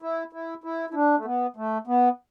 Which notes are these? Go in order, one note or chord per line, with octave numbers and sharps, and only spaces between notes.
E4
E4
E4
E4
D4
A3
B3
A3
B3